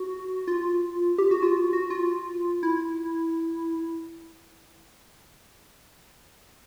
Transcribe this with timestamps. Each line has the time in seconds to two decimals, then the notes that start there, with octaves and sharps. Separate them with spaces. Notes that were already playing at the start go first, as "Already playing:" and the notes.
Already playing: F#4
0.47 F4
1.18 G4
1.31 F#4
1.42 F4
1.73 F#4
1.90 F4
2.63 E4